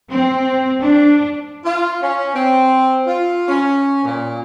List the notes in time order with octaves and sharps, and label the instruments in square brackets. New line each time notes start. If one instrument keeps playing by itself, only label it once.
[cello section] C4
D4
[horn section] F4
C#4
C4
F4
C#4
A#2